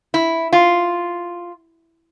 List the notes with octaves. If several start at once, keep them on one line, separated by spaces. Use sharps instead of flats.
E4
F4